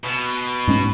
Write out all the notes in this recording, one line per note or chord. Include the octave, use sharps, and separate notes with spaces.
B2
G#2 G#3 C#4